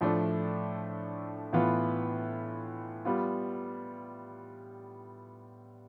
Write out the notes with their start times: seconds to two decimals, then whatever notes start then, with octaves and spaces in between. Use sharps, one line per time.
0.01 A2 F3 A3 D4
1.53 A2 E3 B3 F4 B4
3.05 G3 B3 F4